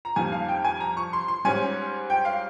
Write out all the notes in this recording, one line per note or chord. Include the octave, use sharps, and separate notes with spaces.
A#5
F2 D#3 G3 A#3 G#5
F5
G5
G#5
A#5
C#6
C6
C6
G#2 G3 C#4 G#5
G5
F5